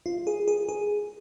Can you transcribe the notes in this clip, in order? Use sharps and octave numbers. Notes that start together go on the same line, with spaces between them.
F4
G#4
G#4
G#4